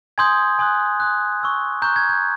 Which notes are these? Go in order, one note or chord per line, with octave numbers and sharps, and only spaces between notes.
G#5 C6 D#6 G6 G#6
G#5 C6 D#6 F#6
C6 D#6 F#6
C#6 E6 G6
A#5 C#6 F#6 G6
G#6
G6